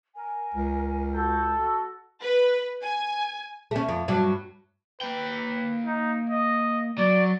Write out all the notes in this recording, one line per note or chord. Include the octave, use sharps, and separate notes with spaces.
A#4 G#5
C#2
F#4 A4 G6
F#4
B4
G#5
A3 C#4
F2
G2 F#3
A#3 B4 G5
D#4
D#5
F#3 D5